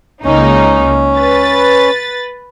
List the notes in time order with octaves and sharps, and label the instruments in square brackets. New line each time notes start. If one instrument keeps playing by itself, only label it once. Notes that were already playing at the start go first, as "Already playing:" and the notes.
[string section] C#2 A#3 D#4 [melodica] C#4
[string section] B4 A6